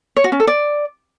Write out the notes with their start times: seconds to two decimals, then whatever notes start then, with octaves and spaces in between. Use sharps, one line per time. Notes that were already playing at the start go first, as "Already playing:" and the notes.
0.16 C#5
0.24 F#4
0.32 C#4
0.40 A4
0.47 D5